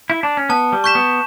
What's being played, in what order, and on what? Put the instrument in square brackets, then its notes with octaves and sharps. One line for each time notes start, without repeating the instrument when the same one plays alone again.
[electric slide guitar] E4
D4
C#4
[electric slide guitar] B3 [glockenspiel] A5
[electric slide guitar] G3
[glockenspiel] C#6 G6 B6 E7
[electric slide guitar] B3